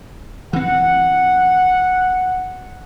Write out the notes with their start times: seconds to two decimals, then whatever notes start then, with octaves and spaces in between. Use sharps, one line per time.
0.53 E3 C4 F#5